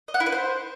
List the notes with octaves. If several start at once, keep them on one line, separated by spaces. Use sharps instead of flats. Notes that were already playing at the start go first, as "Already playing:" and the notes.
D#5
F#5
E4
B4
C5